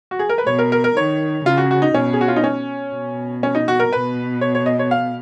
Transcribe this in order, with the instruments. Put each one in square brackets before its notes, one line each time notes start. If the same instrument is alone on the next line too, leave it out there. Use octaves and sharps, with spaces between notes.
[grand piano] F#4
G#4
A#4
B4
[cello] B2 [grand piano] C#5
[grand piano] A#4
A#4
A#4
[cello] D#3 [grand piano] C#5
[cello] C#3 [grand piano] F4
[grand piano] F#4
F#4
D#4
[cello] B2 [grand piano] C#4
[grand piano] G#4
F#4
F4
D#4
C#4
[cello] B2
[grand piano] C#4
D#4
F#4
A#4
[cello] B2 [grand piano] B4
[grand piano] C#5
C#5
D#5
C#5
F5